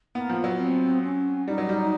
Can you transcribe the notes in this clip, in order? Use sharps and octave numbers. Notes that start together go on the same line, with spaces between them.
A#3 B3
F3
F#3
B3
C4
C#4
G3 D#4
F#3
G3